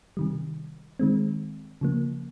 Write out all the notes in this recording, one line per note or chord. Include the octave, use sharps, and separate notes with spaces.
C3 D#3 G3
D#3 G#3 C4
C#3 F3 A#3